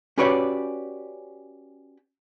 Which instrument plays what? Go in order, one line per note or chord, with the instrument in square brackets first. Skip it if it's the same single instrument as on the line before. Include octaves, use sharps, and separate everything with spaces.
[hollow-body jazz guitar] C#4 F#4 G4 B4 C#5 D5